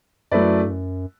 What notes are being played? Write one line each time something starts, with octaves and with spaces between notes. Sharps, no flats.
F#2 F#3 A3 E4 B4 D5
G2
F#2